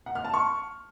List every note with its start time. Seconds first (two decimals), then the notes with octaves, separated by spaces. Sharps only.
0.06 F#5
0.15 F6
0.24 A5
0.34 C#6